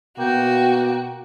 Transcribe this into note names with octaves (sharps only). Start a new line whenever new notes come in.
B2 A#3 F#4 G5